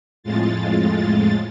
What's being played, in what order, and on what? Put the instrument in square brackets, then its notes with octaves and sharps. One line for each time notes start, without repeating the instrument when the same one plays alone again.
[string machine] F2 A2 G#3 F4 A6